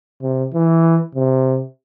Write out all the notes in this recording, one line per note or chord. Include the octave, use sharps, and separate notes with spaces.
C3
E3
C3